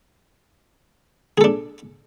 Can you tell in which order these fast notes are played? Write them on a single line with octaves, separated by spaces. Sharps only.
G#4 A4 D4